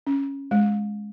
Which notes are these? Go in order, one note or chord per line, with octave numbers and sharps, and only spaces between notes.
C#4
G#3